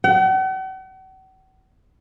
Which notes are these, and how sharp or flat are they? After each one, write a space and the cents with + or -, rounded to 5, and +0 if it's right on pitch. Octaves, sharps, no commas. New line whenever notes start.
F#5 +45